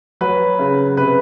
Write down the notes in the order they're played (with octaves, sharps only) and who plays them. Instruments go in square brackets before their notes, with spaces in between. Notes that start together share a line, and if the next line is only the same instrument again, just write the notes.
[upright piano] F#3 B4
C#3
C3 B4